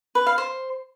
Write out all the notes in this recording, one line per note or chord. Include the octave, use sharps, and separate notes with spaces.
B4
F5
C5